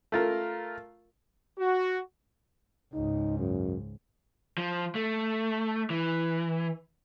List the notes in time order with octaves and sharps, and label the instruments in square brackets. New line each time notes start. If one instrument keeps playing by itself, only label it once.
[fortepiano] A3 F4 A#4
[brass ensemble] F#4
[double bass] C#2 G#2 [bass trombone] D#4
[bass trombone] F#2
[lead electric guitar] F3
A3
E3